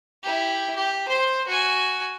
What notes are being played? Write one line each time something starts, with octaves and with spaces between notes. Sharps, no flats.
E4 G4
G4
C5 C6
F#4 G#5